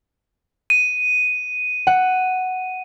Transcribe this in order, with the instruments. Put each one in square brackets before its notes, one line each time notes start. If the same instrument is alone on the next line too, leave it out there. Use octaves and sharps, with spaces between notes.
[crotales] D#7
[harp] F#5